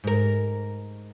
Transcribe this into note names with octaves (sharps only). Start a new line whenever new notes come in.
G#2 A#4